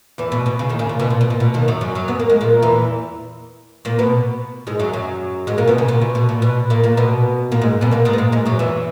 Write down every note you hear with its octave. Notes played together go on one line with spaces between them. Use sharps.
E2 E3
B2
B2
C#3
D#2 D#3
C#3
A#2
B2
A#2
B2
A#2
B2
D#2 D#3
F#2 F#3
F#2 F#3
F#2 F#3
B3
A#3
G#3
A#2 A#3
E2 E3
A#2 A#3
B2 B3
G#2 G#3
F#2 F#3
F#2 F#3
G#2 G#3
A#2 A#3
B2 B3
C#3
A#2
B2
B2
A#2
B2
A#2 A#3
A#2 A#3
B2 B3
A#2 A#3
G#2 G#3
B2 B3
A#2 A#3
G#2 G#3
B3
A#2 A#3
G#2 G#3
F#2 F#3
E2 E3